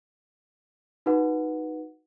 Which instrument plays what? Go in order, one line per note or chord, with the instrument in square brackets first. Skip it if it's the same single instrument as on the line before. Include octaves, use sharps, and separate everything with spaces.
[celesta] D#4 F#4 B4 F#5